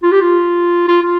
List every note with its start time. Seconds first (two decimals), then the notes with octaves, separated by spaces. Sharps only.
0.03 F4
0.12 G4
0.21 F4
0.88 F4
1.02 F4